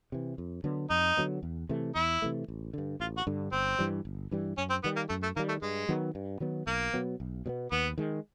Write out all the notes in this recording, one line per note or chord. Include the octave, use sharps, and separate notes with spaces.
C3 E3
F2
D3 F#3 B3
F2 D#4
D3 F#3 B3
E2
C3 E3 A3
E2 E4
C3 E3 A3
A1
G2 D3
A1 F4
F#4
G2 D3
G1 C4
G2 E3 G3
G1
G2 E3 G3
F#2 C#4
C4
D#3 G3 B3
A#3
F#2 A3
A3
D#3 G3 A#3
A3
G2 G#3
D#3 F#3 B3
G2
D#3 F#3 B3
B1 A#3
B2 F#3 B3
B1
B2 F#3 B3
D#2 B3
D#3 G#3